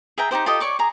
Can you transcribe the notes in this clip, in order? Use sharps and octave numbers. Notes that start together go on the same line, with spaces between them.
G#4 E5 G5 A#5
D#4 E4 G4 C5
F4 G4 A4 D#5
C#5 D5 C#6 D6
G#4 A#5